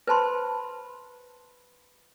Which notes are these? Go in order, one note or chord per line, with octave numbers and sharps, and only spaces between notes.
B4 C5 A5 B5 C6